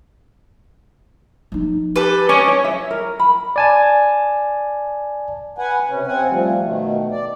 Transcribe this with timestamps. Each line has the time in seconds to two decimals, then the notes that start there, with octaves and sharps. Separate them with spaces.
1.52 F3 D#4
1.96 G4 A4 B4
2.29 C#4 D#5 D6
2.48 C#5
2.64 E5
2.91 A#4
3.19 B5
3.56 D5 G#5 A5
5.58 B4 F#5 G#5
5.89 C3 C#4
6.07 C3 C4 F#5 G#5
6.29 F3 G3 A3
6.62 B2 D#3 A3
7.12 D5